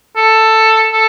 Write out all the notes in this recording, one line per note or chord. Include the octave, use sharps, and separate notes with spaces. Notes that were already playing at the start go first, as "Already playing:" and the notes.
A4
A4